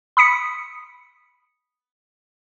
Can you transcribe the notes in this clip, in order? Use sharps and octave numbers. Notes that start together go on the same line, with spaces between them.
B5 D#6 B6 C#7